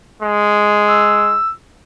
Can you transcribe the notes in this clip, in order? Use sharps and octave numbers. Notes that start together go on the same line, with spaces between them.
G#3
E6